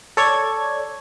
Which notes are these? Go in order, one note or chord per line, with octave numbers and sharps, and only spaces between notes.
A4 C#5 D5 G#6